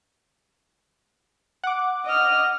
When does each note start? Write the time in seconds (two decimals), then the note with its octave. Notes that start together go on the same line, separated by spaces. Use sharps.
1.64 F#5 D6
2.05 D#5 F6